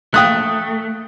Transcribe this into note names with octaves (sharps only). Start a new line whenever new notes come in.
A3 G5 D#6 F#6